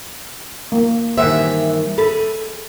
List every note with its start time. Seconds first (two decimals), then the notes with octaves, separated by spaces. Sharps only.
0.72 A#3
1.18 G2 D#3 E3 C5 E5 F#5 G#5
1.98 G#4 A4 B4